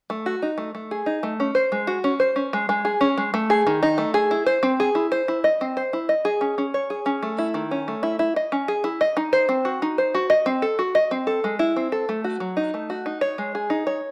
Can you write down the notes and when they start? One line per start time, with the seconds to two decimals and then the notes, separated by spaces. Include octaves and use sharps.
0.10 A3
0.26 F#4
0.42 D#4
0.58 A3
0.75 A3
0.91 G#4
1.06 D#4
1.23 A3
1.40 C#4
1.55 C5
1.72 G#3
1.87 F#4
2.04 C#4
2.20 C5
2.36 C#4
2.53 G#3
2.69 G#3
2.85 G#4
3.01 C#4
3.17 G#3
3.34 A3
3.50 G#4
3.67 D#3
3.83 D#4
3.98 A3
4.14 G#4
4.31 E4
4.46 C5
4.63 C4
4.80 G#4
4.95 E4
5.12 C5
5.28 E4
5.44 D#5
5.61 C4
5.77 C5
5.93 E4
6.09 D#5
6.25 G#4
6.41 C#4
6.58 C#4
6.74 C#5
6.90 G#4
7.06 C#4
7.23 A3
7.38 E4
7.54 D#3
7.71 C#4
7.88 A3
8.03 E4
8.19 E4
8.36 D#5
8.52 C#4
8.68 G#4
8.84 E4
9.01 D#5
9.17 D#4
9.33 C5
9.49 C4
9.65 F#4
9.82 D#4
9.98 C5
10.14 F#4
10.30 D#5
10.46 C4
10.62 A4
10.79 F#4
10.95 D#5
11.11 C4
11.27 A4
11.44 G#3
11.59 E4
11.76 C4
11.92 A4
12.09 A3
12.24 F#4
12.40 F#3
12.57 D#4
12.74 A3
12.90 F#4
13.06 D#4
13.21 C#5
13.38 G#3
13.55 G#4
13.70 D#4
13.87 C#5